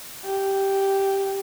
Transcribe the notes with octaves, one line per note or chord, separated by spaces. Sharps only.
G4